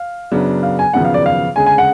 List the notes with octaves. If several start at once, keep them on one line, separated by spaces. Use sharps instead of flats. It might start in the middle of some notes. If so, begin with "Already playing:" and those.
Already playing: F5
F#2 C#3 F#3 B3 D4
F5
G#5
G#1 F#2 C#3 F3 B3 F#5
F5
D5
F5
D2 C#3 G#3 C#4 G#5
G#5
F#5